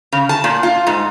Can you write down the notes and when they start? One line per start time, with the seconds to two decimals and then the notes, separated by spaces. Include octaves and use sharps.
0.12 C#3
0.29 A5
0.44 A#2
0.63 F4
0.87 G#2